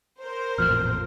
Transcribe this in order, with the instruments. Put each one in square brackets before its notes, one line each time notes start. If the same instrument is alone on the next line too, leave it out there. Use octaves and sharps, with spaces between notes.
[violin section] A#4 C5
[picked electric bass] A1 F2 A#2 [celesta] F6